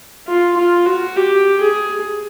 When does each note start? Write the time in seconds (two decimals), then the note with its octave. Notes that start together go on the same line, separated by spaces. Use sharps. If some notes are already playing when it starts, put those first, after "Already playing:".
0.27 F4
0.57 F4
0.86 F#4
1.16 G4
1.61 G#4